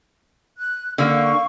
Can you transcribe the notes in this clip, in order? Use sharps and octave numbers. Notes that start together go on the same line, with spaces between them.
F#6
D3 A#3 F5 C#6